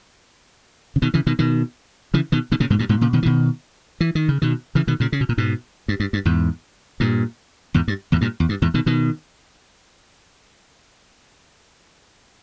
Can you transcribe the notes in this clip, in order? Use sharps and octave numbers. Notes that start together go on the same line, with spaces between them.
C#3
B2 D#3
C#3 E3
B2 D#3
B2 D#3
C#3 E3
B2 D#3
B2 D#3
A#2 C#3
G#2 B2
G2 A#2
G#2 B2
A#2 C#3
B2 D#3
E3
B2 D#3
E3
D#3
C#3
B2 D#3
C#3 E3
B2 D#3
A#2 C#3
C#3
B2
A#2
G#2 B2
G2
G2
G2
E2 G#2
G2 A#2
E2 G#2
G2
E2 G#2
G2 A#2
E2
G2
E2 G#2
B2 D#3
B2 D#3